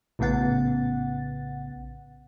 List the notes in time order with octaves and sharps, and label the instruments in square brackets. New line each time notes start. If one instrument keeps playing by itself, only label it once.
[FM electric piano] A#1 A2 C#3 B3 F#5 A6